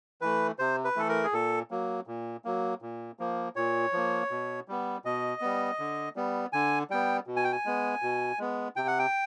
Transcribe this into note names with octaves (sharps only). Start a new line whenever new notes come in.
E3 A3 B4
C3 C5
B4
E3 A3 A4
A#4
G#4
A#2 A4
F#3 A#3
A#2
F#3 A#3
A#2
F3 A#3
A#2 C#5
F3 A#3
B2
G3 B3
B2 D#5
G3 B3
D3
G3 B3
D3 G#5
G3 B3 G5
B2
G#5
G5
G#5
G#3 B3
B2
G#3 B3
C3 G5
F#5
G5